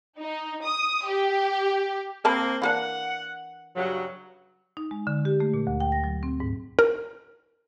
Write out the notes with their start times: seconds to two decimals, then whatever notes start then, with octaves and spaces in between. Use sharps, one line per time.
0.20 D#4
0.65 D#6
1.07 G4
2.25 A#3 C4 A#4 A5 B5
2.62 E3 A#3 D4 F#5
3.75 G2 C#3 F#3
4.77 D#4
4.91 G#3
5.07 D3
5.25 G4
5.40 A3
5.54 A#2
5.67 D2
5.80 G5
5.92 A#6
6.04 F#3
6.23 C4
6.40 G#2
6.79 A#4